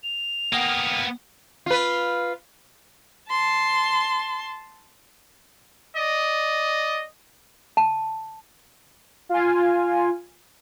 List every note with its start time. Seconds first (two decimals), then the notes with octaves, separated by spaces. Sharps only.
0.04 F7
0.53 A#3 B3 F#5 G5 D#6
1.66 F4 B4
3.30 A5 C6
5.97 D5 D#5
7.77 A5
9.29 F4 G#5